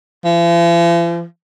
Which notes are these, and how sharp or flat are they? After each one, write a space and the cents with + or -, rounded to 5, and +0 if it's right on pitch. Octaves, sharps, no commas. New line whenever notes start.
F3 -45